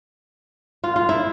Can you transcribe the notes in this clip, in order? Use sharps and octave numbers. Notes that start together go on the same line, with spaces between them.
F4
F4
E4